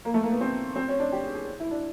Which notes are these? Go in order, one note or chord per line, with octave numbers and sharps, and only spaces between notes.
A#3
A3
A#3
B3
C4
C4
C#4
D4
G4
G#4
G#4
E4
D4